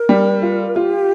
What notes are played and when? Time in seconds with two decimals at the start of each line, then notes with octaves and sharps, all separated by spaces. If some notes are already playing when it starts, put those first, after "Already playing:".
Already playing: A#4
0.09 G3
0.42 F4
0.75 F4 G4